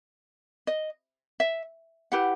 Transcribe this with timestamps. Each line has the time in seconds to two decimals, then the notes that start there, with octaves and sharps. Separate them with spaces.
0.67 D#5
1.40 E5
2.12 E4 G4 B4 F#5